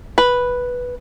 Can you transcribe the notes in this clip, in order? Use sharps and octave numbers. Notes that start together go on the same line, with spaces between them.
B4